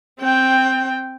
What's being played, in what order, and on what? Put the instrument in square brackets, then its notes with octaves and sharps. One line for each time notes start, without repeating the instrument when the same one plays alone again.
[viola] C4 G5